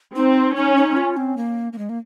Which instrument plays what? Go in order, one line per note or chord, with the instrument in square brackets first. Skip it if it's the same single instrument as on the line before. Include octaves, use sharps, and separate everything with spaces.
[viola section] C4 [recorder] D#4
[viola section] C#4 [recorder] D#4
[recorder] D#4
F4
C4
A#3
A#3
G#3
A#3